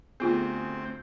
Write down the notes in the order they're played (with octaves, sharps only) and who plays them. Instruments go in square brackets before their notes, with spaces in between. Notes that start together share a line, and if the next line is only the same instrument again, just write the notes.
[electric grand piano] D2 G4 G#4 [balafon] B3 F4 [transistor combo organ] C4